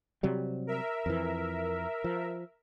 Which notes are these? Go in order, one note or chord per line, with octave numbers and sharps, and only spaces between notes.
C3 F#3 G3
A#4 E5
F2 E3
F3